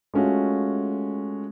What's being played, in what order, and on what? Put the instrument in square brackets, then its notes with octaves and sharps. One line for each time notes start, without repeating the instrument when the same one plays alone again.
[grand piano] G#3 A3 C#4 F4 F#4